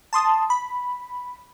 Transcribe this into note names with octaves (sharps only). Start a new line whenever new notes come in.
A5 C6 D#6
B5